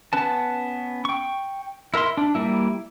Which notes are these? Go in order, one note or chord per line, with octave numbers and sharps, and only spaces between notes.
B3 C#4 B4 A5
G5 C#6
E4 A#4 E5 C6
D4
G3 A3 A#3 E4